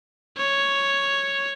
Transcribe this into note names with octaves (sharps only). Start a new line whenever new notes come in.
C#5